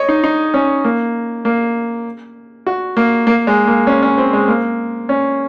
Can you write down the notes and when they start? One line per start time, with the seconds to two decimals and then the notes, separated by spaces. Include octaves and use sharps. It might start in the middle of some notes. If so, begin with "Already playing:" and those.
Already playing: C#5 D#5
0.09 D#4
0.24 D#4
0.54 C#4
0.84 A#3
1.45 A#3
2.67 F#4
2.97 A#3
3.27 A#3
3.47 G#3
3.67 A#3
3.87 C#4
4.03 C#4
4.18 C4
4.33 G#3
4.48 A#3
5.09 C#4